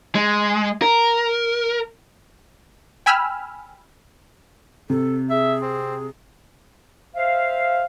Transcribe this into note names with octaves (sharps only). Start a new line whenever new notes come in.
G#3
A#4
G5 G#5 B5 E6 F6
C3 A4
G#4 E5
C4
C5 E5 F5